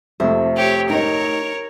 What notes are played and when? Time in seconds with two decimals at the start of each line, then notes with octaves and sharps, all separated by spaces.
0.20 F2 C3 A3 C5 E5
0.56 G4 C#5
0.90 D#4 A#4 C#5 D#5